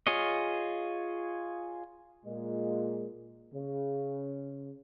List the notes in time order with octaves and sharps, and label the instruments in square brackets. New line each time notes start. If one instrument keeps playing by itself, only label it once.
[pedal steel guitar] F4 G#4 C#5 D#5
[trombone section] A#2 G#3
C#3